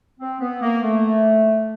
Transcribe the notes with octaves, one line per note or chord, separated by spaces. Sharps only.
C4
B3
A#3
A3